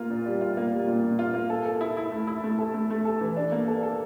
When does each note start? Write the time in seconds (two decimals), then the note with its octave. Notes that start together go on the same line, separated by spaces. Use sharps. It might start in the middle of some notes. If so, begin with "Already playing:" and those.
Already playing: A#3 F4
0.10 A#2
0.26 G3
0.41 F4
0.57 A#3
0.73 G3
0.87 A#2
1.04 A#2
1.19 F4
1.34 A#3
1.50 A4
1.66 A4
1.81 E4
1.97 E4
2.12 A3
2.27 E4
2.44 A3
2.59 A4
2.74 A3
2.90 A3
3.05 A4
3.21 E3
3.37 D4
3.52 A#3
3.68 A4
3.83 A4